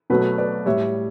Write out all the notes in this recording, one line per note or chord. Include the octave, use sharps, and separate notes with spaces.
B2 F#3 A3 B4
B4 D5
A2 G3 C#5 E5